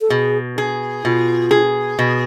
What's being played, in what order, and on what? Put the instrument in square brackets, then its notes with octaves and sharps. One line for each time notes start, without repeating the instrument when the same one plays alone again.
[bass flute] A4
[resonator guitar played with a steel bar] B2 [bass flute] G#4
[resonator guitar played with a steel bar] G#4
[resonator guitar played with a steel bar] B2 [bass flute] F4
[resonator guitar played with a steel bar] G#4
B2